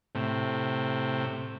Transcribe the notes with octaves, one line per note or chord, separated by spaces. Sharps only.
A2 C3